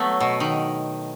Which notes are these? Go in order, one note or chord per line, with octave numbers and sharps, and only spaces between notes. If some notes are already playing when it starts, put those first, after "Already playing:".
Already playing: F#3 A3 B3
B2
D#3